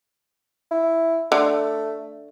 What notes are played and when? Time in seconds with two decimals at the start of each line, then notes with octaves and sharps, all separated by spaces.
0.71 E4
1.32 D3 A3